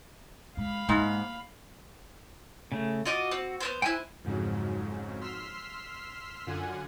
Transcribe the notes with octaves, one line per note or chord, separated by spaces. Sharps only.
G#3 F5 B5
G#2 A#3
C#3 A3
F4 F#4 D#5 D6
C4
B3 C4 C5
E4 C5 G5 G#5 F#6
F2 G#2 C#3 F3 F#3
C6 E6 F6 B6 C7
F#2 D3 F4 F#5 G#5